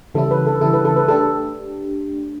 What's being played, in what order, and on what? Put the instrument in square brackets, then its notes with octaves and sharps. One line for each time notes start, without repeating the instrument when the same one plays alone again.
[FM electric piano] C#3 E3 G3 C#4 E4 [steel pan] A4
[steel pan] B4
A4
[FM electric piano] C#3 E3 G3 C#4 E4 [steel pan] A4
[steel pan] B4
A4
B4
[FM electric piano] A3 D4 G4 [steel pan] A4